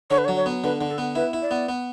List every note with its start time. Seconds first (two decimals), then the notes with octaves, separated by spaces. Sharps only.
0.10 D3 C#5
0.18 B4
0.25 C#5
0.28 F#3
0.37 C#5
0.46 B3
0.64 D3 B4
0.81 D3
0.89 A4
0.98 B3
1.15 E4 B4
1.33 E4
1.42 D5
1.51 B3
1.69 B3